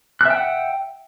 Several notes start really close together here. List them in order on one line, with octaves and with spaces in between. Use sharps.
F#6 E5 G5 F#5